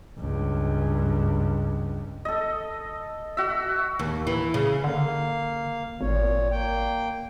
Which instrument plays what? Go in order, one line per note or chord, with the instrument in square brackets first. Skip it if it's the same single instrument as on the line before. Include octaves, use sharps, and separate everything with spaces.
[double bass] C#2 G2
[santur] A4 D#5
F#4 E5
[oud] D#2
E3
C#3
[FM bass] D3 [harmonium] A#3 F5
[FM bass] G#1 [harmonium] A#2 C#5
[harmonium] A#3 G5